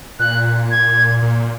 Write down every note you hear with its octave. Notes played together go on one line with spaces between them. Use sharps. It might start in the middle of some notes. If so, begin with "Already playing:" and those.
A#2 F#6
G#6
A#2